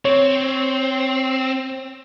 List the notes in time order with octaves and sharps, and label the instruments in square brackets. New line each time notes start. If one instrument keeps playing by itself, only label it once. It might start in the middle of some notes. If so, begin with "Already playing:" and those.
[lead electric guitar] C4 [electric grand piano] C#5